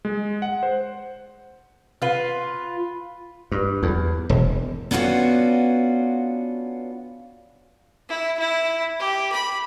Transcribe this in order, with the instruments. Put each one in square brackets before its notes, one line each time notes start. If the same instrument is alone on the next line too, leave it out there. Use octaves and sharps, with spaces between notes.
[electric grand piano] G#3
F#5
C5
[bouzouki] F4 B4
[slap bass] G2
E2
E1
[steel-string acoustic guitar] B3 C#4 D4 F4 F#4
[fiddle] E4
E4
G4
B5